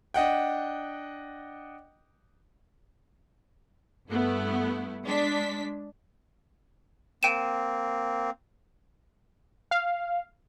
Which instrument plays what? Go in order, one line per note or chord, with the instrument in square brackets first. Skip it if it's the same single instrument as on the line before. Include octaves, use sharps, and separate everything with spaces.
[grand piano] D4 D#5 F#5 G5
[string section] G2 A3 B3 E4
G#3 D4 B6
[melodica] A#3 C4 [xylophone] G5 D#7 E7
[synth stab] F5